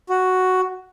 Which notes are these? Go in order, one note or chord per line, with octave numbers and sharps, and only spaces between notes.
F#4